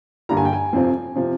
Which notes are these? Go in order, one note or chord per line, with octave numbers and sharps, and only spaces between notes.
G2 D3 G3 A#3 A#5
G#5
G5
G#5
F2 C3 F3 C4
C3 F3